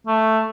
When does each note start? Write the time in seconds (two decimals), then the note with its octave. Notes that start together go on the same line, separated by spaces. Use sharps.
0.07 A3